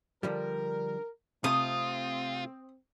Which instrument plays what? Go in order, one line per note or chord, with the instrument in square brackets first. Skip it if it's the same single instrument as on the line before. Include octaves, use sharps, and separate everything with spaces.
[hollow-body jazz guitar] D3 F3 G3 [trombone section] A#4
[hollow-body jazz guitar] C3 A3 [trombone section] C4 [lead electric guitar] F4 [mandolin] D#6